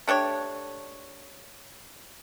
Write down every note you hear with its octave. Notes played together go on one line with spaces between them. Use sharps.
A3 D4 G4 C#5